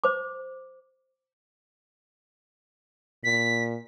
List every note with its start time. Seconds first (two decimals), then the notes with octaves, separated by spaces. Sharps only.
0.04 C5 D6
3.24 A#2 B6